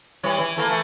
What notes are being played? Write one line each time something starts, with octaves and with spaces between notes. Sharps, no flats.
E3 G3 C#5
E3
E3 A3 A#3
E3 A3